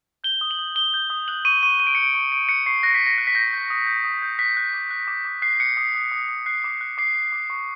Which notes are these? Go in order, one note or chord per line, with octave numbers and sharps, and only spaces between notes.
G6 G7
D#6
F#7
D#6
D#6 G7
G6
D#6
F#6 F#7
C#6 D#7
C#6 D#7
C#6 D#7
D7
F#6 C#7
D7
C#6
C#6 D7
F#6 C#7
C#6 C7
F#6 A#6
B6
F#6
A#6
F#6
B6
G6 A#6
G6
D#6
G6
D#6
G6
F#6 B6
F#6
D6
F#6
D6
D6
F#6 C7
F#6 C#7
D#6 C7
D#6
D#6
D#6
F#6 C7
D6
F#6
D6 C7
D6
D6
C#6